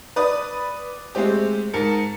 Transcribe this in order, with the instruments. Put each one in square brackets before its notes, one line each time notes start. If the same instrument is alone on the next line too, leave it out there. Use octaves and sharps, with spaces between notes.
[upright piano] B4 D5 D#6
G#3 A3 C4 G4
G#2 A#4 A5 C#7